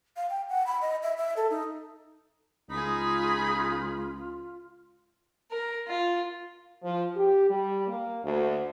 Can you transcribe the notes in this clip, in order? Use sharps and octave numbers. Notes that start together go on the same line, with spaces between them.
F5
G5
F#5
B5
D#5
E5
E5
A4
D#4
C#2 D#4 F4 G#4 B5
A#4
F4
F3
G4
G3
A#3
D2